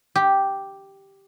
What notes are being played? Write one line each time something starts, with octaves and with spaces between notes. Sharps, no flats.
G4